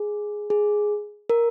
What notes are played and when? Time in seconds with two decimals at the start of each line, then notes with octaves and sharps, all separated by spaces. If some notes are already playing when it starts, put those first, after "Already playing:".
Already playing: G#4
0.50 G#4
1.29 A#4